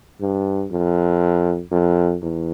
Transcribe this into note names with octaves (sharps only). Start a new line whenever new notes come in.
G2
F2
F2
E2